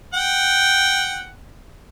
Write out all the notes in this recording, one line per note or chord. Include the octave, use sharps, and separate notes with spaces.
F#5 G5